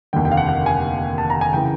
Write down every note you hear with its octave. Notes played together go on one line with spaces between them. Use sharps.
F1 D#2 D3 G5
G5
F5
F#5
F#5
G#5
A5
A#5
G#5
C#3 E3 G5